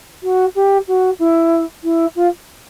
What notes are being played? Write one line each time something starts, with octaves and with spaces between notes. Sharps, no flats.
F#4
G4
F#4
E4
E4
F4